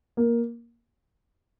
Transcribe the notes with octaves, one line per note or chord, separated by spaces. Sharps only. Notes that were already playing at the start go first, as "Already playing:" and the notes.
A#3